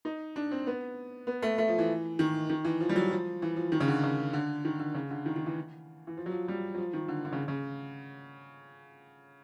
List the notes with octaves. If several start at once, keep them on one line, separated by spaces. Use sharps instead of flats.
D#4
D4
C4
B3
B3
A3
A3
F3
E3
D#3
D#3
E3
F3
G3
F#3
F3
E3
F3
D#3
C#3
D3
C#3
D3
D#3
D3
C#3
D3
D#3
D#3
E3
E3
F3
F#3
F3
G3
F#3
F3
D#3
D3
D3
C#3
C#3